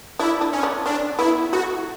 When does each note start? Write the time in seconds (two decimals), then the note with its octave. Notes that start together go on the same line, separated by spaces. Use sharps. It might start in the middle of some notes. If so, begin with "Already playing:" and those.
0.19 D4 E4
0.41 D4
0.53 C#4
0.63 D4
0.86 C#4 D4
1.19 B3 E4
1.53 A3 F#4